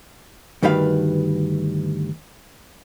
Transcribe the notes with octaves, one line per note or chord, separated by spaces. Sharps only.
D2 G2 D#3 G3 B4 F5